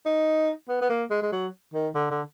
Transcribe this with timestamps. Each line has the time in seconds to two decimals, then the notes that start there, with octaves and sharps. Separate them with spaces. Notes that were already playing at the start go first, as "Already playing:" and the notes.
0.06 D#4
0.69 B3
0.82 B3
0.90 A#3
1.10 G#3
1.22 G#3
1.32 F#3
1.74 D#3
1.95 D3
2.11 D3